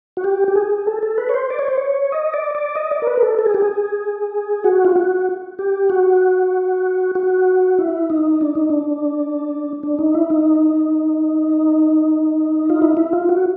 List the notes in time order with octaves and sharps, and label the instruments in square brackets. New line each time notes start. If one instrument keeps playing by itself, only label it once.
[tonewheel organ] F#4
G4
G4
G#4
A4
A4
B4
C#5
C5
D5
C#5
C5
C#5
D#5
D5
D5
D#5
D5
A#4
B4
A#4
A4
A4
G#4
G4
G#4
F#4
F4
F#4
G4
F#4
F#4
E4
D#4
D4
D#4
D4
D4
D#4
E4
D#4
F4
E4
E4
F4
F#4